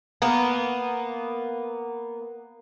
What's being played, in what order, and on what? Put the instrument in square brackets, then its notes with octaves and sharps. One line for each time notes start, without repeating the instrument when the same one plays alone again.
[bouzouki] A#3 B3